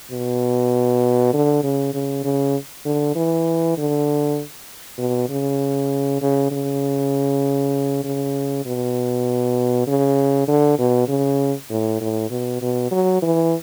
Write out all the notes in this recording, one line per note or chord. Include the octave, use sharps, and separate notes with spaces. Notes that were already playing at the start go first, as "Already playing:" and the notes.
B2
D3
C#3
C#3
C#3
D3
E3
D3
B2
C#3
C#3
C#3
C#3
B2
C#3
D3
B2
C#3
A2
A2
B2
B2
F#3
E3